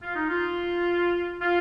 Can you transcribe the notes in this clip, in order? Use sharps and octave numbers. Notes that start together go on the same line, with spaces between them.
F4
D#4
F4
F4